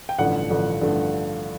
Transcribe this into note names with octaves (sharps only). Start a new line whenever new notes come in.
G5
A1 G2 D3 F3 A3 F#5
A1 G2 D3 F3 A3
A1 G2 D3 F3 A3